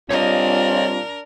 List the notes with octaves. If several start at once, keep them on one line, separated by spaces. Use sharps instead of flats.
G3 C4 D4 F4 A#4 C#5 D#5